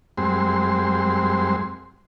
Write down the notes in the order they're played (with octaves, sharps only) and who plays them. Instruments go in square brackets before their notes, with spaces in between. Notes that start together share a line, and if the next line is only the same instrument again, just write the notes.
[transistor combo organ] F#2 G3 G#3 C4 C6